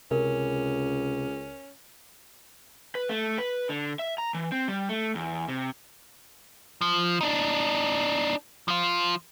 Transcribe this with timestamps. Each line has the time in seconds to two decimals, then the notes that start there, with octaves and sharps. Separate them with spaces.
0.11 C#2 C3 C#4 A#4
2.95 B4
3.09 A3
3.38 B4
3.69 D3
3.99 E5
4.18 A#5
4.34 E3
4.52 C4
4.68 G3
4.89 A3
5.15 E2
5.48 C3
6.81 F3
7.21 D4 D#4
8.68 F3 F4